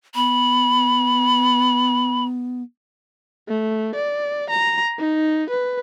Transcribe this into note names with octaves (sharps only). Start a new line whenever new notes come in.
B3 B5
A3
D5
A#5
D#4
B4